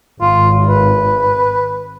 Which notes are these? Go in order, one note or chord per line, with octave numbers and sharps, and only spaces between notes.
G#1 F4
B4